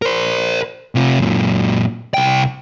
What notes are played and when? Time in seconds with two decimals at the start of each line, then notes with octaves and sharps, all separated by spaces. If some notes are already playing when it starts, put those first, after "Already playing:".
0.02 A#4 C5
0.95 C3 F4
1.19 F#2 A#2
2.14 C2 G5